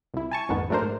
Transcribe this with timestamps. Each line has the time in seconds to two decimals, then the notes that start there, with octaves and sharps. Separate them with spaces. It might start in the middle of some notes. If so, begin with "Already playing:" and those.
0.14 C2 E4
0.31 G#5 A5 C#6
0.49 A#1 F2 G#2 D#3 B3
0.70 F#3 A3 D4 A#4 C5
0.82 G#2